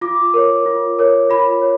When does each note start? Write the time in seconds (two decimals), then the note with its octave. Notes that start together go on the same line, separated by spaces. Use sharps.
0.01 F4 D6
0.34 A#4 C#5
0.66 F4
0.99 A#4 C#5
1.30 F4 B5
1.61 C#5